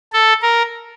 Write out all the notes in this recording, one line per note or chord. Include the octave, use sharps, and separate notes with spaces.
A4
A#4